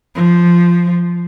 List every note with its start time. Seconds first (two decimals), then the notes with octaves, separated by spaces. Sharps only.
0.15 F3